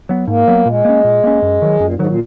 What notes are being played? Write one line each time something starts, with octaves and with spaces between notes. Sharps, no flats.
F#3 B3
G#2 A#3
F#3 B3
A#2 G#3
A#3 C#4
A#2
A#3 C#4
F#2
D#3 F#3
F#2 A#2
G#2
D#3 F#3
A#2